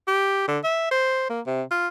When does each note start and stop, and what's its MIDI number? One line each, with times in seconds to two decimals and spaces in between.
0.08 0.44 67
0.48 0.59 50
0.64 0.89 76
0.91 1.25 72
1.30 1.41 58
1.46 1.63 48
1.71 1.88 65